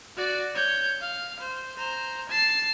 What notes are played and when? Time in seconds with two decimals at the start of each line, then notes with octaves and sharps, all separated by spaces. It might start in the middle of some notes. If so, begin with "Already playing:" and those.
0.17 F#4 D5
0.55 C#5 G6
1.00 F5
1.40 C5
1.77 C5 A#5
2.30 A5 C7